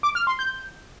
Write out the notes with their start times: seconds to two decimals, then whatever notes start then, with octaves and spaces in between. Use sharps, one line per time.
0.03 D6
0.15 F6
0.27 C6
0.39 G6